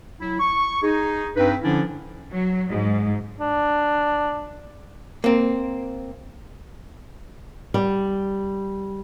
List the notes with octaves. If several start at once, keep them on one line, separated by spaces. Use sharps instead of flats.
F#3 E4
C#6
D#4 G#4
G2 C4 D#4 B4
D3 F3 C#4 D4 E4
F#3
G#2
D4
A#3 C4
G3